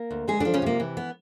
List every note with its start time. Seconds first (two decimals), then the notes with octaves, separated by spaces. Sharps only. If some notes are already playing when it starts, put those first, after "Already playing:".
Already playing: A#3 A#4
0.11 D2
0.27 D2 G#3 G#4
0.40 D3 F3 D4
0.54 C#3 C#4
0.62 C3 A#3
0.80 E3
0.97 B3